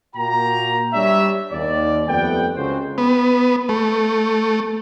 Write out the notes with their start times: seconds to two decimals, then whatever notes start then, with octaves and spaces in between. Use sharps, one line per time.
0.16 A#2 A#3 F#4 G5 A#5
0.93 G3 D4 C#5 E5
1.52 D#2 D5
2.07 F2 G3 A3 B3 F#5 G5
2.56 C#2 F#4 C5
2.98 B3
3.69 A3